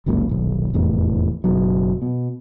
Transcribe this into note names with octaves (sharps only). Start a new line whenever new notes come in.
G1 C#2 F#2 A#2
D#1 B1
F1 E2 A2 E3
F#1 B2 F#3
B2